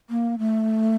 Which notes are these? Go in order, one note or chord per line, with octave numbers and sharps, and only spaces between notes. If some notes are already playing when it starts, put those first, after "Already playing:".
A#3
A3